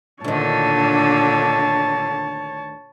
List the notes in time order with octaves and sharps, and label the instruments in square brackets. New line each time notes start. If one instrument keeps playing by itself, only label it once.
[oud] D2 D#3 [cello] A#2 D3 [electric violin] C#5 A5